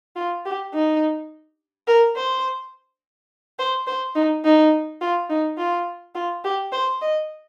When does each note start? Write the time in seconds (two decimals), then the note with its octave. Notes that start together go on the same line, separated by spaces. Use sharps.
0.16 F4
0.45 G4
0.73 D#4
1.87 A#4
2.16 C5
3.59 C5
3.87 C5
4.15 D#4
4.44 D#4
5.01 F4
5.30 D#4
5.57 F4
6.15 F4
6.44 G4
6.72 C5
7.01 D#5